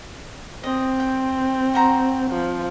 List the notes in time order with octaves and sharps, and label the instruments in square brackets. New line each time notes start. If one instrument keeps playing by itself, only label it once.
[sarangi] C4 [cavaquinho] D#5
[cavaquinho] G5
F#4 C5 A#5
[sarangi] F3